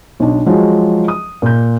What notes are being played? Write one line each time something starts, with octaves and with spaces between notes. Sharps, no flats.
B1 D4
F3 F#3 G#3
D#6
A#2 G6